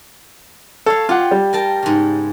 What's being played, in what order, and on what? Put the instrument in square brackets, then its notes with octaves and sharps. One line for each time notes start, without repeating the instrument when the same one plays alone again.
[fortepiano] A4 [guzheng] C#5 F5
[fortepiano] F4 F#5 [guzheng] G4
[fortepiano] G3
[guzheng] A#4 G5 A5
G#2 C#3